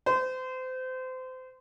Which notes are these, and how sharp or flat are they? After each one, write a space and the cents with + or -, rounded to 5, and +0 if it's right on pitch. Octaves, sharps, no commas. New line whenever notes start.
C5 -30